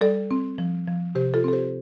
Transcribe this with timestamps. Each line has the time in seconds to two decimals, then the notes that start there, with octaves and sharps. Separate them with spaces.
0.01 G3 A4 D5
0.31 C4
0.58 F3
0.88 F3
1.15 C3 G4 C5
1.34 F4 A4
1.44 C4 A4
1.53 G4 C5